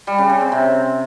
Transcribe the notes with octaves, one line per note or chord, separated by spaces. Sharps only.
G3
C#3
C#3
C4
C3